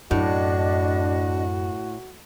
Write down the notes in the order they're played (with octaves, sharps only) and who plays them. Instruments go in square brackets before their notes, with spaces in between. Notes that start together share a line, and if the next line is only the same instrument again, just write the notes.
[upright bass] F#2 [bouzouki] A2 [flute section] D4 D#5 [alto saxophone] F#4